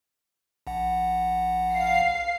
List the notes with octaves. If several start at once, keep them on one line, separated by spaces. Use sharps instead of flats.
A#1 F#5
F5 C7